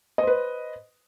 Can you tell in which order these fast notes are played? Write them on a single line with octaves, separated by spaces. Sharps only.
D#5 C5 B4